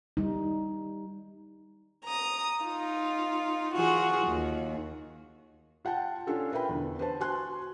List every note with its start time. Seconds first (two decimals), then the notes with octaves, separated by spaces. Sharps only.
0.17 G3 D#4
2.04 A#5 D#6
2.63 D#4 F4
3.76 E3 F4 F#4 G#4
4.28 D#2
5.85 F4 F#5 G5 A5
6.27 C#4 D4 F4 A4
6.52 A#4 B4 E5 G5 B5
6.69 E2 D3
6.99 B4 C5 A5
7.20 F#4 G#5 C6 F#6